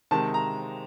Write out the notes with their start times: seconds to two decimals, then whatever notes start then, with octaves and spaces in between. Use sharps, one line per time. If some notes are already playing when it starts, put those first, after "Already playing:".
0.11 C3 D#3 G#3 A5
0.34 A#5